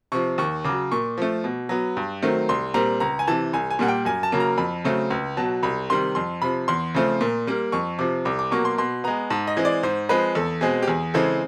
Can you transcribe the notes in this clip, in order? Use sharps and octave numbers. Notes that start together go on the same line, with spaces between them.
C3 F3 C#6
D#2 C#6
C#3 F#3 D6
A#2 C#6
F3 A3
B2
F#3 B3
G2
D#3 F#3 A3 C4
C2 C6
A#2 G3 C4 A#5
C#2 A#5
G#5
C3 E3 A5
C2 G#5
G#5
A#2 G3 A#3 F#5
G5
F#2 G#5
A5
C#3 F#3 A#3
A#5
F2 B5
C#3 F#3 A3 C4
C#2
B2 F#3 A5
C2 B5
C3 D#3 G3 C6
F2 C6
C3 F3 B5
E2 C6
C#3 F3 A3 C4
A#2
G3 A#3
F2 C#6
C3 F3 D6
C2 D6
D6
B2 F#3 A#3 C#6
C6
B2 C6
G#3 B3 A#5
G#2 A5
D#5
E3 G#3 C4
D5
G#2 C5
F3 G#3 C4 B4
E2 A4
B2 G#3 C4 G#4
G4
E2 G#4
C#3 E3 G#3 C4 A4